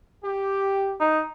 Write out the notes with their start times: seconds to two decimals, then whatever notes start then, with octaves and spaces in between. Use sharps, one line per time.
0.24 G4
1.00 D#4